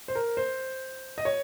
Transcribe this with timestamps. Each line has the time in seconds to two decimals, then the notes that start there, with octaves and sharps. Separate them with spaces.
0.08 C5
0.15 A#4
0.37 C5
1.18 D#5
1.25 C#5